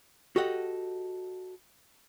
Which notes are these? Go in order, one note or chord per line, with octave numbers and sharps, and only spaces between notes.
F#4 G4 A4 D#5 F#5